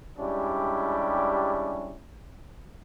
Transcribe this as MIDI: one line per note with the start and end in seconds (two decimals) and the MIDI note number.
0.18 1.98 55
0.18 1.98 56
0.18 1.98 61
0.18 1.98 62
0.18 1.98 64
0.18 1.98 67